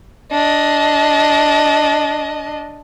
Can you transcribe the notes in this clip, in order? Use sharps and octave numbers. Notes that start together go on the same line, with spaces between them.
D4 D#5